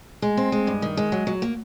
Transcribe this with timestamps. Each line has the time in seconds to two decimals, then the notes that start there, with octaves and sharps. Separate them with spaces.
0.22 G#3
0.37 C4
0.52 G#3
0.67 G2
0.82 D#3
0.97 G#3
1.12 F#3
1.27 F#3
1.42 A#3